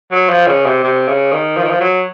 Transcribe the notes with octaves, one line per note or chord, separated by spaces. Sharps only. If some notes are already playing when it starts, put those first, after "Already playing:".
F#3
F3
C#3
C3
C3
C#3
D#3
F3
D#3
F3
F#3